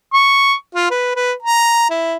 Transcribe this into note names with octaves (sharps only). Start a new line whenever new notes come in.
C#6
F4
B4
B4
A#5
E4